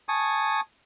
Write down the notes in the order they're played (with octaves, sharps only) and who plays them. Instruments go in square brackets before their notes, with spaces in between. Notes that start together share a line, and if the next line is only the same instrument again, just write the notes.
[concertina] G#5 A5 C#6 D#6